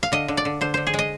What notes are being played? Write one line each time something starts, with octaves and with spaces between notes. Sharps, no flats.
F5
D3 D#5
D3
D5
D3
D3 C5
D3 C5
G#4
G#3 D#5